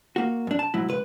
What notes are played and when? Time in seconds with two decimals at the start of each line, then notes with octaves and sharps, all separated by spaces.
0.16 A#3 F#4
0.47 F#2 D4
0.59 A5
0.74 G#2 F#3 E4
0.88 C#2 B4